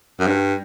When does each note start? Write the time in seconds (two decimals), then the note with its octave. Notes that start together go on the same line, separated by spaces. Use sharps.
0.20 F#2
0.27 G2